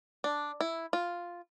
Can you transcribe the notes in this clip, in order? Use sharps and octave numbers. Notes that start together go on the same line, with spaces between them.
D4
E4
F4